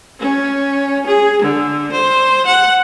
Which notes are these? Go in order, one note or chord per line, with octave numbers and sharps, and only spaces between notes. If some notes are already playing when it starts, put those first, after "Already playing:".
C#4
G#4
D3
C5
F#5